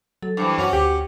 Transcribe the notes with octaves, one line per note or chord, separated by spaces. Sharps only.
F#3 A4
G2 E3 C5 D6
F#2 C#4 F#4
D2 G4